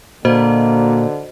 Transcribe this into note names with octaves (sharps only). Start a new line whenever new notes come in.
A#2 D3 A#3 F#4 C5 D#5